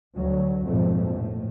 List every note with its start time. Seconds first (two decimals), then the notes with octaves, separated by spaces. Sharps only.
0.16 D2 F#3
0.65 A#1 F2 G#2 B2 A3
1.14 A2